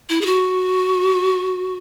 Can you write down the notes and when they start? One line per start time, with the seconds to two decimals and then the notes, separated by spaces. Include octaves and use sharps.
0.09 E4
0.21 G#4
0.26 F#4